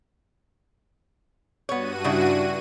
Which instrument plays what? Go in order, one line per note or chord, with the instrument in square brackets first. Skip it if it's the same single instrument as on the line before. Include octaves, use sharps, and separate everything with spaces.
[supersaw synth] G2 F#4 D#7 [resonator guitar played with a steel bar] B3 C#5
[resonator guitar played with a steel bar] C#3 D4 E4